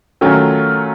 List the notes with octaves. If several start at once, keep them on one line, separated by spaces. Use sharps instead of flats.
D#3 F#3 A3 C#4 F4